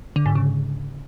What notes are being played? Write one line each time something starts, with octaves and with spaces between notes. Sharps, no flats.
D3
G#2
C#3